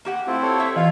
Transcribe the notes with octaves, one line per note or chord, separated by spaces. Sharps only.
A#3 G4 F#5
A3 C4 E4 F4
A4 C#5
C#5 E5
E3 F4 F5